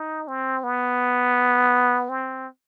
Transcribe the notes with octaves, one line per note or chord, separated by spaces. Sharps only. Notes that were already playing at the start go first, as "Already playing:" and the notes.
Already playing: D#4
C4
B3
C4